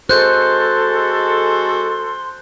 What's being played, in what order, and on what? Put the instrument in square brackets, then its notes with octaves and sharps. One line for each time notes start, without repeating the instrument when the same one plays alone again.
[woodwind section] G#3 F#4 A4 [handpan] C5 [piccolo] C6 [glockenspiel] F#6 G6